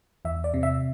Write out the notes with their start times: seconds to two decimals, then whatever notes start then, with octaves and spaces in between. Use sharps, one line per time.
0.25 E2 E5
0.44 D5
0.54 C3
0.63 E5